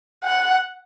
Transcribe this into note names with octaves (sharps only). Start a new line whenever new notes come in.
F#5